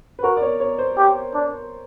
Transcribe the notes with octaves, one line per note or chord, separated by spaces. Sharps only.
B4
F#4 A#4
D5
C#5
C#5
C5
G4
D4